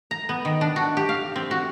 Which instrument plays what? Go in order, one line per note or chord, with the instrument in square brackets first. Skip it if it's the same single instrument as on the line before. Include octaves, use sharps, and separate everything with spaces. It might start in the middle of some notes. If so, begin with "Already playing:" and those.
[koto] A#5
B3
D#3
D4
F#4
G4
F5
C4
F#4